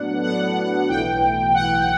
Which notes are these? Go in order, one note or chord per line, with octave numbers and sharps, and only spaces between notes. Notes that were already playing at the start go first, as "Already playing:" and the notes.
Already playing: A2 F#3 B3 D4 F#5
A2 F#3 B3 D4 F#5
B1 A2 E3 G5
B1 A2 E3 F#5